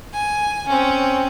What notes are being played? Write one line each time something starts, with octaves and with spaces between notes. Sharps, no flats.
G#5
C4 C#4